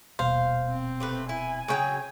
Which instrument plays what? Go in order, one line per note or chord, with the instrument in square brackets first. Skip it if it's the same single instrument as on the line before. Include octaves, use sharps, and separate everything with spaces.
[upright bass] D#1 B2 [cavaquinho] C5 [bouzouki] F5
[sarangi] C4
[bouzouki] C3 A3 B4
[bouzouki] E4 [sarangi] G#5
[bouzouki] C#3 E3 F#3 [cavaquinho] G#4 C#5 G5